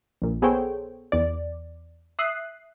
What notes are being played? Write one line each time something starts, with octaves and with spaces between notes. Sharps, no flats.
A#1 A#2
B3 G#4 A4 C5 C#5 G5
E2 D5
E5 D#6 F#6 C7